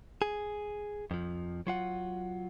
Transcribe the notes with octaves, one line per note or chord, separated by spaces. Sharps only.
G#4
F2 F3
F#3 F4 F#5